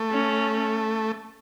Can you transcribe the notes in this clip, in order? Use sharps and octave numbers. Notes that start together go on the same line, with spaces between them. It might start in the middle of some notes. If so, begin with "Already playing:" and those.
Already playing: A3
C#4